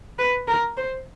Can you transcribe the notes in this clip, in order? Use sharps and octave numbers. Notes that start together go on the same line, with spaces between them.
B4
A#4
C5